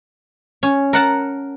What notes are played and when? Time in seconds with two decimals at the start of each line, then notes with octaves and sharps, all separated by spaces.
0.63 C#4
0.93 A#4 F#5 A5